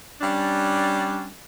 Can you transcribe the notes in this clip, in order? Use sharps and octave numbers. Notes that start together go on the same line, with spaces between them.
G3 C#4 D4